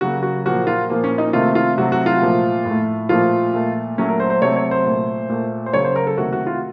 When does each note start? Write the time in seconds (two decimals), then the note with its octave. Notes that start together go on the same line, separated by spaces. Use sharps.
0.01 C#3 F#3 A#3 F#4
0.23 F#4
0.45 A#2 F3 A#3 F#4
0.67 F4
0.90 A#2 F3 A#3
1.04 C#4
1.18 D#4
1.33 C3 D#3 A3 F4
1.55 F4
1.77 C3 F#3 A3 F#4
1.92 F#4
2.06 F4
2.22 A#2 F3 A3
2.65 A2 A3
3.09 A#2 F3 A3 F4
3.54 A#2 A3
3.98 A#2 F#3 A3 C#4
4.09 A#4
4.20 C5
4.30 C5
4.42 C3 F#3 A3 C#5
4.56 C#5
4.71 C5
4.85 A#2 A3
5.30 A#2 A3
5.66 C5
5.73 C#3 F#3 A#3 C#5
5.84 C5
5.96 A#4
6.07 A4
6.18 C3 D#3 A3 F#4
6.32 F#4
6.46 F4